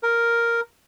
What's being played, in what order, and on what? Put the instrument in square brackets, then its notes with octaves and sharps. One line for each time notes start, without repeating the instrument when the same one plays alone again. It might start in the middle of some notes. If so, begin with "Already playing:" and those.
[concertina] A#4